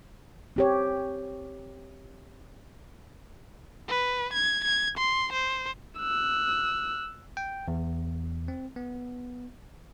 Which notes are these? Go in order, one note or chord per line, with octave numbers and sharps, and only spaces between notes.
C4 G4 C#5
B4
G#6
G#6
C6
C5
E6 F#6
G5
E2
C4
B3